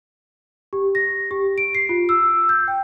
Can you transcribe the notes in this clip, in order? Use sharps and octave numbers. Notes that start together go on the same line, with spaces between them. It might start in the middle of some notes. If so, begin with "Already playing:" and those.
G4
A#6
G4
D7
C7
F4
E6
G6
G5